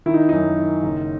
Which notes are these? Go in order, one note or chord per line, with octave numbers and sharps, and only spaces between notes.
D#3 E4
D#4
F#2 D#4
D#3
F#1